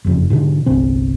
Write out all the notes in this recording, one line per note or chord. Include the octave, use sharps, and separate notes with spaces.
F#1 F2 C#3
G#2 B2 D3
G1 C2 C4